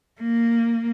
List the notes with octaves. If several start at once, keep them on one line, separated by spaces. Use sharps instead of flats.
A#3